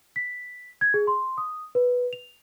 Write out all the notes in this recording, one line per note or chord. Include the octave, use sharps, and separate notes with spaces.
B6
G#6
G#4
C6
D#6
B4
F7